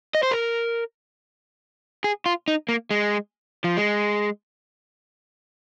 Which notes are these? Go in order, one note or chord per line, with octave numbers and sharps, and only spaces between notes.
D#5
C5
A#4
G#4
F4
D#4
A#3
G#3
F3
G#3